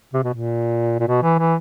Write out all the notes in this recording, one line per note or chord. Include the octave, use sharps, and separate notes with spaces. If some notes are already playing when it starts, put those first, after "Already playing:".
C3
B2
A#2
A#2
B2
E3
E3